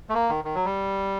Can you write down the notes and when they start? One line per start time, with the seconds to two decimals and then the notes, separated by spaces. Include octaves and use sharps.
0.09 A3
0.14 A#3
0.29 D#3
0.45 D#3
0.55 F#3
0.65 G3